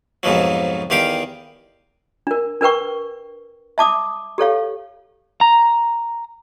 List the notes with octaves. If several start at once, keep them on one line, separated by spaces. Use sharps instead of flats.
F2 G#2 B2 F3 F#3
E2 D#3 G4 F5 G5 D6
D4 A#4
D4 A#4 B4 G5 C#6
E5 A5 D6 D#6
G4 A4 C#5 F5
A#5